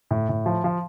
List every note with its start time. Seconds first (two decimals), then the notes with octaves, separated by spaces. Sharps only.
0.11 A2
0.29 A2
0.46 F3
0.64 F3